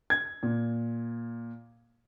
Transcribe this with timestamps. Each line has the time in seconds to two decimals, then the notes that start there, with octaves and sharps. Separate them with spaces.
0.10 G#6
0.43 A#2